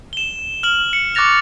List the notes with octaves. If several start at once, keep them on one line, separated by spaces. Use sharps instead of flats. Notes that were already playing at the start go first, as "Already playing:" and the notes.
E7 G7
F6 F#7
C#7
C#6 D6 F#6 A6 A#6 F7